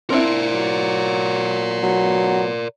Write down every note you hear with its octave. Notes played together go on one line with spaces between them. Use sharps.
C4 D4 E4 A#4 D5
F#3
F#3 B3